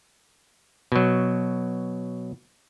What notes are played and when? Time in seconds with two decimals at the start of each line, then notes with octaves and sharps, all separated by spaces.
0.92 B2 F#3